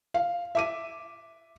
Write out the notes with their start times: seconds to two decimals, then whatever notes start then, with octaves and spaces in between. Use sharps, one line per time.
0.14 F5
0.55 E5 D6 D#7